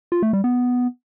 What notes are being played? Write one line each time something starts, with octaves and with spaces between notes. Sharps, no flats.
F4
A3
G3
B3